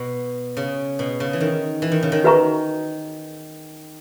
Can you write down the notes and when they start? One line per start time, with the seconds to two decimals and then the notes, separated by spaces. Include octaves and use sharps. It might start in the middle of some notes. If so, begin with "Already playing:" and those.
Already playing: B2
0.57 C#3
0.99 B2
1.20 C#3
1.33 E3
1.41 D#3
1.82 E3
1.92 D#3
2.03 C#3
2.12 D#3
2.24 F#4 B4 E5 A#5 C#6